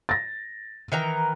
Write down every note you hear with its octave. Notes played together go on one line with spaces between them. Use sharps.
A6 A#6
D#3 E3 A#5